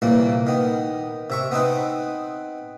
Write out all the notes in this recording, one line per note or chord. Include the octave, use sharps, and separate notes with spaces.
C2 A#2 E3 A#3
D#3 B3
C3 E5 C#6
B3 C4 D#4 B4